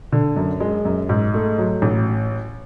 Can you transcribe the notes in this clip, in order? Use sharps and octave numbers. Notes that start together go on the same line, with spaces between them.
D3
F#2
G#3
F#2
G#2
A3
F#3
A1